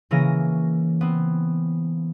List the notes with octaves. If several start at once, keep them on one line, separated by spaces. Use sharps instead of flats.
C#3 E3 A#3 C#4 A#6 D#7
B3 C4